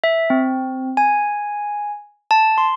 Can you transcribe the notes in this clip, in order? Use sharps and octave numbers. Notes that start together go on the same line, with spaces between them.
E5
C4
G#5
A5
C6